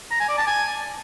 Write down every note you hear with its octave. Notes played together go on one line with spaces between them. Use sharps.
A#5
G#5
D5
A5
G#5